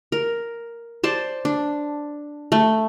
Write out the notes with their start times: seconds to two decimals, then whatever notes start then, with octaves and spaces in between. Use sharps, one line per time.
0.12 A#4
1.04 C5 D5 A5
1.45 D4
2.52 A3